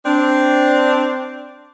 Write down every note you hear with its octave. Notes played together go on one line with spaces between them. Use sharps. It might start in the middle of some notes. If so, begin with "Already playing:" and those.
C4 D4